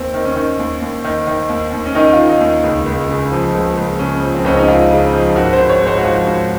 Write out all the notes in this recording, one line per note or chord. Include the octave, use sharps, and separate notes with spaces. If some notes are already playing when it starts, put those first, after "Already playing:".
Already playing: D#2 C4
D#3
C#4
D#3
D#2
D#2
D#3
D#3
D#2
D#2
C#4
D#3 D#4
F4
D#3
D#4
D#2
C#2
C#2
C#3
F3
C#2
C#2
C#3 C#4
F3
C4
C#2 C#4
D#4
C#2 F4
C#3
F3
G#1 F#4
C5
G#1
C#5
G#2
C5
F#4
F3 F4
G#1 F#4